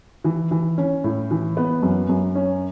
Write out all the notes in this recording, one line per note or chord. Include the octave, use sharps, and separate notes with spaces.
E3
E3
C#4
A2
E3
B3
F#2
F#2
C#4